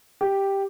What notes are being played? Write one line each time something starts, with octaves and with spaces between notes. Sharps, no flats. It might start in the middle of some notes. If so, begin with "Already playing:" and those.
G4